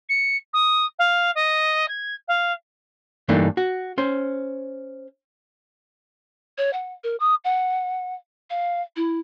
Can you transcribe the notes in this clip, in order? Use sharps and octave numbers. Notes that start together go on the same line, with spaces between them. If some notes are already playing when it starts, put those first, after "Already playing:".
C#7
D#6
F5
D#5
G#6
F5
G2 E3 A3 A#3 D4 D#4
F#4
C#4 C5
C#5
F#5
A#4
D#6
F#5
F5
E4